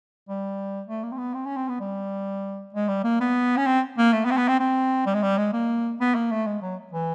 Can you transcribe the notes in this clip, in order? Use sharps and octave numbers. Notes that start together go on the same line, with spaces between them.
G3
A3
A#3
C4
B3
C4
C#4
C4
B3
G3
G#3
G3
A#3
B3
C#4
C4
A#3
A3
B3
C4
B3
C4
C4
G3
G#3
G3
G#3
A#3
B3
A#3
A3
G#3
F#3
E3